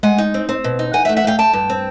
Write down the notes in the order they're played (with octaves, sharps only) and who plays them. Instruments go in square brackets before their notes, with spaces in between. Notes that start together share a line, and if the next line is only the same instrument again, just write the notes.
[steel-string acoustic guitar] G#3 F#5 G#5
D#4
C4
C4
B2
D#4
E3 F#5 G#5
E5 F#5
A3
E5 F#5
A3 F5 G5
A3 G5 A5
G2
C4